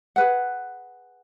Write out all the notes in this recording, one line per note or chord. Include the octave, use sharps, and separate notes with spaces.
G#4 B4 F#5